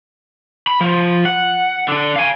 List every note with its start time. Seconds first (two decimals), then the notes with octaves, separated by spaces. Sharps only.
0.67 B5
0.81 F3
1.25 F#5
1.88 D3 D4
2.16 F5 G#5